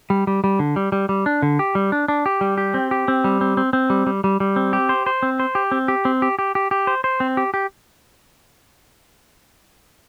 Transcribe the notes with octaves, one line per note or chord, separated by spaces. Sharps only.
G3
G3
G3
D3
G3
G3
G3
D4
D3
G4
G3
D4
D4
G4
G3
G4
C4
G4
C4
G3
C4
C4
C4
G3
G3
G3
G3
C4
G4
C5
C5
C4
C5
G4
C4
G4
C4
G4
G4
G4
G4
C5
C5
C4
G4
G4